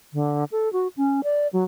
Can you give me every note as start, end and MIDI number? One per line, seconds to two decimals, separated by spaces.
0.13 0.44 50
0.52 0.71 69
0.73 0.88 66
0.97 1.21 61
1.24 1.47 74
1.53 1.64 54